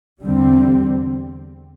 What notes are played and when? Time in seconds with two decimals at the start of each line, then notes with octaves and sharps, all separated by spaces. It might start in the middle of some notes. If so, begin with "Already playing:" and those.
0.22 E2 D3 G3 C4